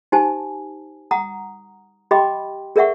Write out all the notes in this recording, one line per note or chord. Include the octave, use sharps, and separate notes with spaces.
D#4 G4 C5 G#5 A5
F#5 A#5 D#6
G4 D#5 G5 B5 C6 D6
G#4 A#4 D5 E5 F#5 C#6